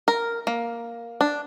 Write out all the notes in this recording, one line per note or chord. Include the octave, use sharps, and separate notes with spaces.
A#4
A#3
D4